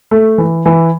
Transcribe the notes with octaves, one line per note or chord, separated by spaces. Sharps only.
A3
E3
E3